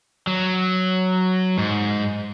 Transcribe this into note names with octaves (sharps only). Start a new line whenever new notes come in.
F#3
G#2